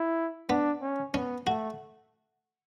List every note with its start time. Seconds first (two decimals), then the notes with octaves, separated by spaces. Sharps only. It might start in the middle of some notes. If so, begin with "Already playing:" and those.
Already playing: E4
0.49 B3 D4
0.82 C#4
1.14 B3 C#4
1.47 A3 F#4